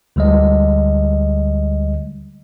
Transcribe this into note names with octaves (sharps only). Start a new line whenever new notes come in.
D2 D3 G3 G#3 D#5